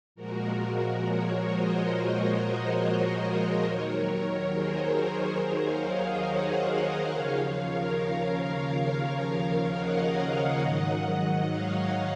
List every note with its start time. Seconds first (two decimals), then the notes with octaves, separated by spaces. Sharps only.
0.15 A#2 F3 G#3 F#4 A#4
0.59 F#4 A#4
1.02 A#4 C#5
1.46 C5 D#5
2.77 A#4 C#5
3.64 D#2 D#3 F#3
4.50 G#4 C5
4.95 G#4 C5
5.37 A#4 C#5
5.67 C#5 F5
5.96 C5 D#5
6.25 D#5 F#5
7.12 D#2 C#3 F3 C#5 F5
7.41 C#5 F5
7.70 A#4 C#5
7.99 C#5 F5
9.74 D#5 F#5
10.61 G#2 D#3 F#3
11.47 C#5 F5